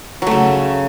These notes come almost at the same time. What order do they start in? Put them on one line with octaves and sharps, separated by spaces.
F#3 A3 C#3